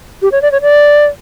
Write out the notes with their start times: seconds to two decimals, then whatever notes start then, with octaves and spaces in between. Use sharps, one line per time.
0.22 G4
0.32 C#5
0.42 D5
0.52 C#5
0.62 D5